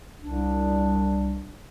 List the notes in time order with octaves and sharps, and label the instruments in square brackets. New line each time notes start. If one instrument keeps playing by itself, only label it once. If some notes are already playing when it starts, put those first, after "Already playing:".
[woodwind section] C2 D4